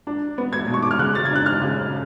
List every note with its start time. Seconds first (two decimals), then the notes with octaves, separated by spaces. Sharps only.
0.07 D4
0.38 B3
0.53 G#6
0.68 B2
0.74 C#6
0.82 D6
0.91 F6
0.99 C#3 F#6
1.15 A6
1.25 G#6
1.31 D4 F#6
1.46 F6
1.62 C#3